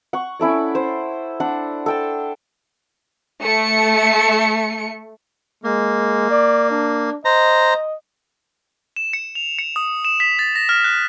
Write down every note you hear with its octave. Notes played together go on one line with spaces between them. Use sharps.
F#5 C#6
C#4 E4 A4 D5
C5
D4 F#5
A4 G5 A5
A3 C#7
G#3 A#3
D5
D4
C5 D#5 A#5
E7
C#7
F7
C#7
D#6
E7
B6
A6
A#6
F6
F#6